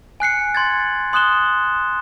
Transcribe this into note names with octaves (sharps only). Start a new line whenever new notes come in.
G#5 F#6 C7 C#7
C6 G#6 A6
C6 D#6 F#6 E7 G7